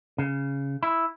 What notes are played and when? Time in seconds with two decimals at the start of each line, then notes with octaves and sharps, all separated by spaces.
0.18 C#3
0.83 E4